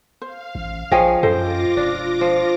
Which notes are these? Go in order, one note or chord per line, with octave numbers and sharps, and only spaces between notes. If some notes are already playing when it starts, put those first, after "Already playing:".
C5 F5
A1
A#1 F3 G#4 C#5 D#5 G5 G#5
F#2 F4 A4 C5 D#5 G5 D6 A#6
E1 D4
F3